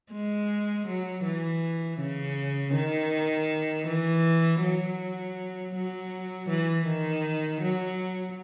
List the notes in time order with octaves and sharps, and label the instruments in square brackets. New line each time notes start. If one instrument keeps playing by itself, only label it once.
[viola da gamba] G#3
F#3
E3
C#3
D#3
E3
F#3
F#3
E3
D#3
F#3